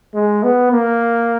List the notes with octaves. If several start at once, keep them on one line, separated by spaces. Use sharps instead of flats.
G#3
B3
A#3